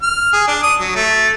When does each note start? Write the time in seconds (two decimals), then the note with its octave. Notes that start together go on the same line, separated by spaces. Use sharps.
0.02 F6
0.33 G#4
0.48 D4
0.63 D#6
0.80 F#3
0.95 A3